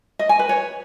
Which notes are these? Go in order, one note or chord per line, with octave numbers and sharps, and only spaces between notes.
D#5
G#5
B4
C#5